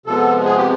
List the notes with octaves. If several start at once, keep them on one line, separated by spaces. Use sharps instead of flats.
C3 F3 G#3 B3 A4
G#4
G4